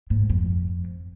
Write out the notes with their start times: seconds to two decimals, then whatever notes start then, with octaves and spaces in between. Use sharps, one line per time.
0.10 G#2
0.30 F2